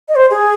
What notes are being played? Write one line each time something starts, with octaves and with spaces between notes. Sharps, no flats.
D#5
C5
G#4